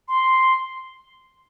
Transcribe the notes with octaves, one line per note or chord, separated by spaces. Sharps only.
C6